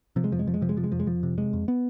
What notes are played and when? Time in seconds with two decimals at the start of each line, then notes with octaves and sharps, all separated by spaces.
0.16 C3 F3
0.24 G#3
0.31 F2 F3
0.39 G#3
0.47 F2 F3
0.54 G#3
0.61 C3 F3
0.69 G#3
0.76 C3 F3
0.84 G#3
0.92 F2 F3
1.00 G#3
1.07 F2 F3
1.23 C3
1.38 C3 G#3
1.53 F2
1.68 B3